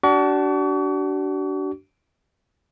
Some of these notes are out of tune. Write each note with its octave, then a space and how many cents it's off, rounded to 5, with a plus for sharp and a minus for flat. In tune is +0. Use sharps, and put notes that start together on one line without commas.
D4 -15 F#4 +40 C#6 +45